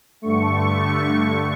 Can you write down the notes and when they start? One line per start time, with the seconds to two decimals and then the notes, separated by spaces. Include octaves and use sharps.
0.22 G2 D3 A3 C#6